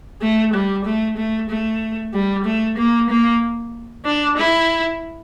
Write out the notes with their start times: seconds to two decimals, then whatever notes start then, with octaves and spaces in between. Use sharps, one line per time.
0.22 A3
0.54 G3
0.85 A3
1.17 A3
1.50 A3
2.14 G3
2.45 A3
2.78 A#3
3.10 A#3
4.05 D4
4.37 E4